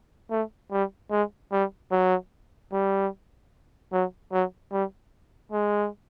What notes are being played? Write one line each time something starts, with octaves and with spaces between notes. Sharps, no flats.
A3
G3
G#3
G3
F#3
G3
F#3
F#3
G3
G#3